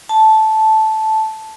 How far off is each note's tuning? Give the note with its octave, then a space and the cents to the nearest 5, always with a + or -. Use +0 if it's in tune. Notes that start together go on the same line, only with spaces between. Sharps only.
A5 -10